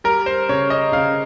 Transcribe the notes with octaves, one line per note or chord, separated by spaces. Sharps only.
G3 A#4
C5
C#3 C#5
D#5
C#3 F5